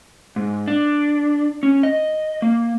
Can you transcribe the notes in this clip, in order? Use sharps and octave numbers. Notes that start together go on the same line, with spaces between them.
G#2
D4
C#4
D#5
A#3